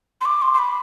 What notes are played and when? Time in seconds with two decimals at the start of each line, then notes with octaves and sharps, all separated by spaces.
0.21 C6
0.25 D6
0.42 C6
0.54 C6
0.59 B5